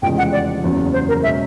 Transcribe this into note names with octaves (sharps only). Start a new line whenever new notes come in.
F1 E2 C#3 F3 G#3 G5
F#5
D5
F#1 E2 C#3 F#3
C5
A#4
B2 G#3 C#4 E5